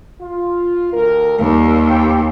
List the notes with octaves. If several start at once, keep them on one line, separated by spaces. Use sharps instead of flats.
F4
D2 A#4
D#2 G3 A#4
G4 B4 G5